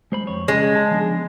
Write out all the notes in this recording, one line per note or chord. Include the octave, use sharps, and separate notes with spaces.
G#3 C5 B5
F2 C#5
C#3 G#3
A5
F3 B3 D4